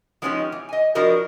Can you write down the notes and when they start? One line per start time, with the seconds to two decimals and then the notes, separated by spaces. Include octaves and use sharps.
0.22 F3 G#3 B3 C#4 D#4 G4
0.52 E3
0.69 D#5 G#5
0.95 F3 D4 E4 F#4 A#4 D#5